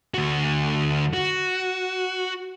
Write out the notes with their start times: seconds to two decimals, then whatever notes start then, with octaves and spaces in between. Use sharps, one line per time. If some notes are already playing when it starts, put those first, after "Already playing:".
0.14 D2 F#4
1.14 F#4